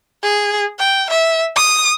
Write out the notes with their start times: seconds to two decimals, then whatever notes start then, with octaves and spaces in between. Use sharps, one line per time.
0.23 G#4
0.79 G5
1.10 E5
1.55 D#6